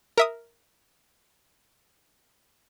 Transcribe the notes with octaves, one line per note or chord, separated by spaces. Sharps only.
A#4 E5 D#6